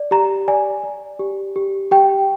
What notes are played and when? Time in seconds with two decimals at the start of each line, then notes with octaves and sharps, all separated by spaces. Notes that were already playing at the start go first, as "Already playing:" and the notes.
Already playing: D5
0.11 G4 A#5
0.48 D5 G#5
0.83 D5
1.19 G4
1.56 G4
1.91 G4 G5